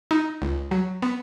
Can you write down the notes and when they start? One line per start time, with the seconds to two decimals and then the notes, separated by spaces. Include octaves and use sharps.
0.11 D#4
0.42 C#2
0.71 F#3
1.02 B3